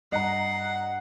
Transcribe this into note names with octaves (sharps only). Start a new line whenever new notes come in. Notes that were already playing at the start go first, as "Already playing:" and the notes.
G2 D#5 F#5 A#5 C7